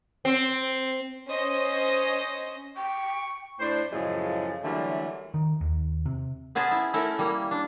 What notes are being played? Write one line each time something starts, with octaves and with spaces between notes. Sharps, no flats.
C4
C#4 C5 D#5
G5 C#6
A2 D4 C5
F#2 A2 C#3 F3 G#3 A3
D3 E3 F#3 G3 A3 A#3
D#3
D#2
C3
B3 C#4 G#4 C5 A5
E4
A3 C#4 E4 A4 A#4
G3 A#3
D4